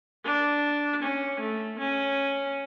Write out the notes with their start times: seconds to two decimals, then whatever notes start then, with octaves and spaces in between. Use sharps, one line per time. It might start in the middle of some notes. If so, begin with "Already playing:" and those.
0.24 D4
1.02 C#4
1.40 A3
1.79 C#4